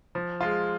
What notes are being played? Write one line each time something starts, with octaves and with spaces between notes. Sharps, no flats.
F3
G#3 F4